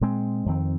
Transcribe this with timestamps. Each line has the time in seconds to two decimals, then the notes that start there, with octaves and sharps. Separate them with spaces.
0.01 A#2 G#3 C4
0.46 F2 D#3 C4